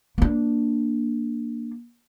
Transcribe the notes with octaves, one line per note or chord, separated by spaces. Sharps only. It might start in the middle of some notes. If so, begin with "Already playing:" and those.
A#3 D4